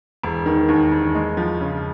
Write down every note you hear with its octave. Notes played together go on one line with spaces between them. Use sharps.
E1
D#3
D#2
E1
G#3
F3
C#3